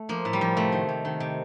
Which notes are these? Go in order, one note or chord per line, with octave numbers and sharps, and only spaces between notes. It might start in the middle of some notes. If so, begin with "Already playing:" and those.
Already playing: A3
F3 A#3
A2
G3
F3
C3 A3
D#3
C3
D#3
C3